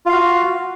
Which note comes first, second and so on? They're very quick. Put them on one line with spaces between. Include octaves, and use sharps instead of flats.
F4 F5 F#4